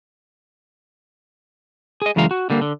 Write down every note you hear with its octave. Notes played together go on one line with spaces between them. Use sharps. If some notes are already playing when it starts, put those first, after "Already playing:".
G#4 D#5
F#2 C#3 E3 G#3 F5 A#5
F#4
D3 G3 A#3
D3